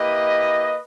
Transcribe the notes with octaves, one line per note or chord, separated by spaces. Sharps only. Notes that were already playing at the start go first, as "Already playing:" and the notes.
Already playing: A#3 E4 G4 B4 D#5